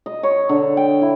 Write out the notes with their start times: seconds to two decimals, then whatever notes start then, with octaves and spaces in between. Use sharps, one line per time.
0.06 D#5
0.23 C#5
0.49 D3
0.77 G5
1.02 E4